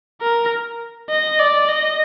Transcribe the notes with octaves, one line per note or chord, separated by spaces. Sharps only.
A#4
D#5
D5
D#5